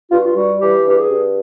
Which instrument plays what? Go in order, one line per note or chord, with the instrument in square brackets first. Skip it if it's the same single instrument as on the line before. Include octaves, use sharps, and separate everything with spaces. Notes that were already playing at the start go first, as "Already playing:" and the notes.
[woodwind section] G2 F4
F#4
F4
G3 F#4
E3 G4
G2 G4
G#4
G2